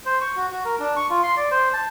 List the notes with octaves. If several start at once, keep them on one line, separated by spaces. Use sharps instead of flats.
C5
C#6
F#4
F#4
A#4
D4
C#6
F4
C6
D5
C5
A5